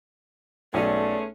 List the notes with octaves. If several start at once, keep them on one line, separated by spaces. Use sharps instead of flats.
B1 G#3 A3 B3 C#4 D5